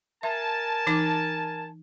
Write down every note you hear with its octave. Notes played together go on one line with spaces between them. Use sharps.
A#4 E5 G#5 A5
E3 D#4 D6